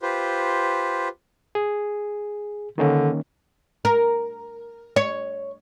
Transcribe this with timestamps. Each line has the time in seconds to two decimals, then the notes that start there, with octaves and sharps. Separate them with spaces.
0.02 F4 G4 B4 C5
1.55 G#4
2.78 D3 D#3 A#3 C#4
3.85 A#4
4.96 C#5